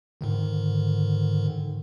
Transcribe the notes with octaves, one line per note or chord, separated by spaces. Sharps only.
G#2 D3 D#3